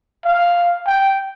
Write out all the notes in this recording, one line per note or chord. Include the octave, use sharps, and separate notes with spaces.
F5
G5